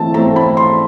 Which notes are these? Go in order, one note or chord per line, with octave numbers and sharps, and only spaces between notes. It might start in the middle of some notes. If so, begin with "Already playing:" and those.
Already playing: E3 A3 C4 A5
E3 A3 C4 A#5
B5
C6